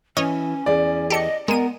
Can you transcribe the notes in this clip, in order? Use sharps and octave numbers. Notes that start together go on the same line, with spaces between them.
E3 C#4 C#5 D#5 F6
E2 E3 G#4 D5
G4 A4 D#5 C#7
G#3 B3 A#4 D#7